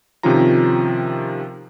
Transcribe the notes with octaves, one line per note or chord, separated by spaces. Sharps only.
C3 D#3 F3 C#4 F4 A#5